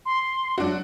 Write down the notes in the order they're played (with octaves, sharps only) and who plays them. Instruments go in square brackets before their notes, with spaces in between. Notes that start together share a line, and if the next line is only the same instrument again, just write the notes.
[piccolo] C6
[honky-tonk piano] F#3 D4 F#4